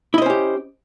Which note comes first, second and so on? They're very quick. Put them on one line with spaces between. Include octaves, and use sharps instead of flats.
E4 D#5 C5 C#4 G4